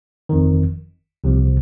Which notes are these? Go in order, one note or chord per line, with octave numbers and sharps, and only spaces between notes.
G1 F2 D#3
C2 C3 F3